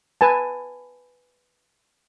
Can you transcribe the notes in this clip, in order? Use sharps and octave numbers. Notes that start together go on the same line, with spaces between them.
B4 G#5 A5